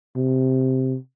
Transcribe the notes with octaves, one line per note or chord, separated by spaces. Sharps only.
C3